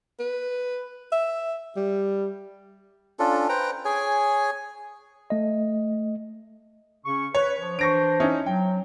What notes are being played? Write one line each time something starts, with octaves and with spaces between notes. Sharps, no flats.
B4
E5
G3
C#4 D4 F4 A4
B4 C5 G5 A#5
G#4 C#5 G#5
A3 D#5
C#3 C#4 C#6
B4 C#5
F3
E3 D4 C5 C#6 A#6 D7
C#4 D#4 E4
F#3 G5